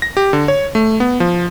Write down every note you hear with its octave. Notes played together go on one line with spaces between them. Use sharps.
A#6
G4
D3
C#5
A3
B3
F3